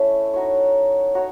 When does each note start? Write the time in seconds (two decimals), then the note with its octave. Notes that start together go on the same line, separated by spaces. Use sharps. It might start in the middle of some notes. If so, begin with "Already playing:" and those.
Already playing: A3 C#4 E4
0.34 D#4 F#4 C#5
1.14 D#4 F#4 C#5